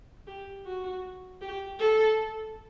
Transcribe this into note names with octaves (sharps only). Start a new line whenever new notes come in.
G4
F#4
G4
A4